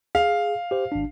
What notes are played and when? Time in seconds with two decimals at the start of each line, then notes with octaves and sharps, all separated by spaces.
0.15 G#4 F5
0.71 G4 C5
0.92 G#1 D4